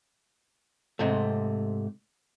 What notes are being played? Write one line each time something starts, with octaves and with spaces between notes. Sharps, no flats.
G#2 C3 A3